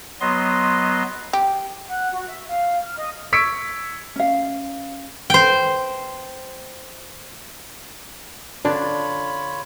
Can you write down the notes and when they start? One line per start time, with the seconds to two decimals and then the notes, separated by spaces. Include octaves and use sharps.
0.21 F#3 B3 D#5 C6
1.33 G4
1.88 F#5
2.12 F#4
2.27 E5
2.46 F5
2.82 F6
2.96 D#5
3.33 C#6 E6 G#6 B6 C#7 D7
4.16 C#4 F5
5.30 C5 G5
8.65 D3 D4 F4 C#5 B5